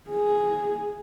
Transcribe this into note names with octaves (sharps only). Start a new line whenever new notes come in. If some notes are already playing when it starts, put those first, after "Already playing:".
G#4